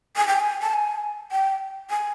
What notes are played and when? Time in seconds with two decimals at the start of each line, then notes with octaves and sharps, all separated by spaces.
0.16 G#5
0.27 G5
0.40 G#5
0.62 A5
0.74 G#5
1.31 G5
1.90 G#5